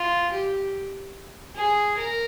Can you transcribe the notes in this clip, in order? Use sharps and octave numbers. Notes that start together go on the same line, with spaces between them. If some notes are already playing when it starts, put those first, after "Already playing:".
Already playing: F4
G4
G#4
A#4